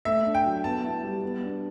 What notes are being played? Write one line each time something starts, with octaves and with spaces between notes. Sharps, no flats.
A3 E5
D4
G5
F#3
B3 A5
E4
G3
B3
D4